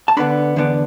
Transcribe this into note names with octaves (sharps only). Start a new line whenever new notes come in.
A5
D3 B3 D4 B5
E2 D3 B3 D4